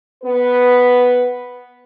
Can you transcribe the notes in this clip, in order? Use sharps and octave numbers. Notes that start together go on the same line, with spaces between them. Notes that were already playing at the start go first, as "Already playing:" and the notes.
B3 B4